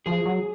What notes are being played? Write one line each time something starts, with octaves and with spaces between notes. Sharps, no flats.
F3 G#4
F#3